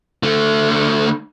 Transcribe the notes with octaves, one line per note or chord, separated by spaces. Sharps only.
D3 A3